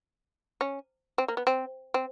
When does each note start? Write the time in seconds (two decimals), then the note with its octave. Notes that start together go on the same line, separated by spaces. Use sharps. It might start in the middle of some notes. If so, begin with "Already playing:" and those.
0.61 C#4
1.18 C4
1.28 A#3
1.37 B3
1.47 C4
1.94 C4